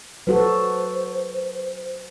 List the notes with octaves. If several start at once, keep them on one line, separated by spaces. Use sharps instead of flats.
F#3 F#4 A4 B4 C5